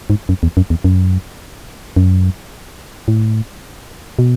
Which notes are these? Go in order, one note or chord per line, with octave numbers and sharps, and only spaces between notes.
G#2
F#2
E2
F#2
E2
F#2
F#2
A2
B2